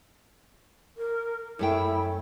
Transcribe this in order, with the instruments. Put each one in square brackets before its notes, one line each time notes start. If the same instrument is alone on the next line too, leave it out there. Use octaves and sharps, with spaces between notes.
[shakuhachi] A#4
[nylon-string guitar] F#2 A3 G5 [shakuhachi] E4